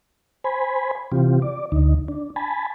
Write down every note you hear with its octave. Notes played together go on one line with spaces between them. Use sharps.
C5 G#5 B5
C3 E3 C4 F4 G4
D5
D2 D3 D#4
D4
G#5 A5 B5